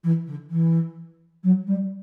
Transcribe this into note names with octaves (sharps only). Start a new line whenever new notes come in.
E3
D3
E3
F#3
G3